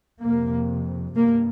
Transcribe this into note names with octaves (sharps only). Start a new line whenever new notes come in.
F2 C3 A#3
G2 A#3